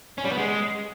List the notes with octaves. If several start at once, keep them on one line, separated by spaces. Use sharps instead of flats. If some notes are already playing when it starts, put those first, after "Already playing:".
C#4
G3
B3
G#3